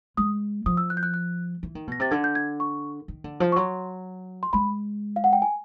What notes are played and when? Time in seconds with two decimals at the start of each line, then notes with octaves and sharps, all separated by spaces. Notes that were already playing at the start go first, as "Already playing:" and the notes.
0.17 G#3 D#6
0.66 F3 D#6
0.77 E6
0.90 F#6
0.97 G6
1.03 F#6
1.14 F#6
1.63 E3
1.75 D#3
1.87 B2 A#6
2.00 C3 A6
2.11 D3 G#6
2.24 G6
2.35 G#6
2.60 C#6
3.08 D#3
3.24 D3
3.40 F3
3.52 C#6
3.56 F#3 C6
4.43 C6
4.53 G#3 B5
5.16 F5
5.24 F#5
5.33 G5
5.42 G#5